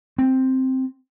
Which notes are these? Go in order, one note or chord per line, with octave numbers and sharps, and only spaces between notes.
C4